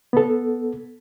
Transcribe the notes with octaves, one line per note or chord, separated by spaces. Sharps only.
B3 A4